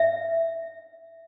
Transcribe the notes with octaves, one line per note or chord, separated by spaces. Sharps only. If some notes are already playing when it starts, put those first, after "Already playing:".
Already playing: E5